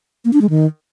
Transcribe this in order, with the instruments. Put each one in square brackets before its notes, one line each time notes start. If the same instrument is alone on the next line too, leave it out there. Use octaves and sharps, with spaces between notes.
[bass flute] A#3
D4
G#3
D#3